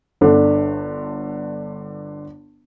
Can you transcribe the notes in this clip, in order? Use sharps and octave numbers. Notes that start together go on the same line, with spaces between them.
G1 D3 D4